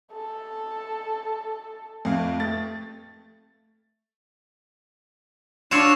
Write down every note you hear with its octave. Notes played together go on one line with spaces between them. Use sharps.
A4
F2 A3 F5
A3 A6
D4 F4 F#4 C#5 C#6 E6 E7